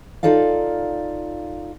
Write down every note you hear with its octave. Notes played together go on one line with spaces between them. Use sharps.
D#4 F4 A4 D5 F5